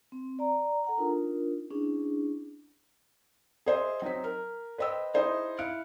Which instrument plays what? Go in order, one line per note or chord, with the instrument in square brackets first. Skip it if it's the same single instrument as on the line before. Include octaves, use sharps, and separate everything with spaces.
[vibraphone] C4
D5 A#5
A4 F#5 A#5
D4 D#4 F4 A#4
C#4 D4 E4 G#4
[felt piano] G#4 C5 D#5 E5
F#3 C4 D#4 B6
A#4
B4 C5 D#5 G5 E6
D#4 E4 G#4 C5 D#5
E4 F5 F#6 C#7 D7